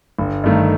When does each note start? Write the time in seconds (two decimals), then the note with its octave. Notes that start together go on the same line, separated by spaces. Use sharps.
0.19 G1
0.44 G2 D#3 A3 D#4